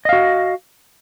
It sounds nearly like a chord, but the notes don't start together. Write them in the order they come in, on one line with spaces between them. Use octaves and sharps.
D#5 F5 F#4